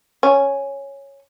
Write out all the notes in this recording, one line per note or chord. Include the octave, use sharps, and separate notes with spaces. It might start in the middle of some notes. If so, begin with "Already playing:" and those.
C#4